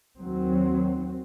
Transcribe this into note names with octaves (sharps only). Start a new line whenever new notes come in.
D#2 D#3 F#3 C4